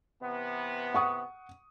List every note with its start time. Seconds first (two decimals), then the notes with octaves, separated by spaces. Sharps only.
0.23 C3 E3 B3
0.94 F#5 C#6 D#6